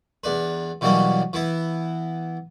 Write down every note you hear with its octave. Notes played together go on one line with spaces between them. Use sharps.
E2 D4 B4
B2 E3 F#3 G3 A#3 C#4
E3 B3 E4